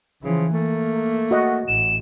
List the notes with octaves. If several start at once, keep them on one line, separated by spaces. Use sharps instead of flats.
C#3 E3 F3
A3 A#3
F#4 D#5 F#5
A1 A2 E7